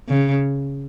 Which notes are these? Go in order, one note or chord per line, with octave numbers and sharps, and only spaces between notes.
C#3